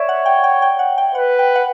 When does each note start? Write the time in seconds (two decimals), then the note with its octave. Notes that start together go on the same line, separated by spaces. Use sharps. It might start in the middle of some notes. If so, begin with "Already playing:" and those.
Already playing: C#5 D5 E5
0.09 F#5
0.26 G5
0.44 G5
0.62 G5
0.79 F#5
0.98 G5
1.15 B4 F#5
1.39 G5
1.55 F#5